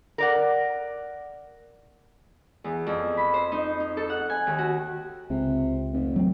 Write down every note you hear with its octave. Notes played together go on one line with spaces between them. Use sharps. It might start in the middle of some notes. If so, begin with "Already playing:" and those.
A#4 D5 F#5
E2
F2
B5
C5
D#4
D#4
A4
F#5
G#5
D#2
F#4
C#2 C3
F1
F#3 A3 C4